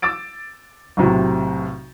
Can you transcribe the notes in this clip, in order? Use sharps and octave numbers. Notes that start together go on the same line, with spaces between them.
D6 E6 A6 D7
B1 A2 C3 F#3